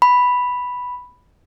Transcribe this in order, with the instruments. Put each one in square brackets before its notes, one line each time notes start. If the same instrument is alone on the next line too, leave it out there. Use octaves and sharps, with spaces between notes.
[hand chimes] B5